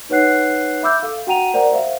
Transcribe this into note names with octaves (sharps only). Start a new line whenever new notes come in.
D#4 B4 C#5 F#5 F#6 C7
E5 B5 D6 E6 G6
A4 F5
F#4 F#5 G5 A#5 D#7 F7
A#4 C5 D5 F#5 A#5
C5 E5 F5